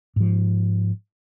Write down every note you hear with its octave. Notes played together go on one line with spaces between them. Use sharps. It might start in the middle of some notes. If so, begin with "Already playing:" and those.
G#2 F3